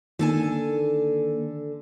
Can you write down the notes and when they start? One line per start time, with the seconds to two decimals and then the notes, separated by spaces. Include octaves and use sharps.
0.19 D3 D#3 A#3 A4 G#5